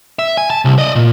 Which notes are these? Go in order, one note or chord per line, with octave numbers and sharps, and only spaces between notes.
E5
G#5
A5
C2
D5 D#5
A#2